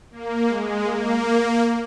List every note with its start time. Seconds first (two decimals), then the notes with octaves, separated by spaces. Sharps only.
0.11 A#3
0.48 G#3
0.85 A#3